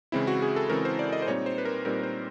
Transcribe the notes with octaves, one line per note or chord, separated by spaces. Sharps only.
C#3 E3 G#3 C4 E4
F#4
G#4
A4
C#3 E3 G#3 C4 A#4
C5
D5
D#5
C5
A#2 G3 C4 D#4 C#5
C5
B4
A#4
A#2 G3 C4 D#4 A#4
C5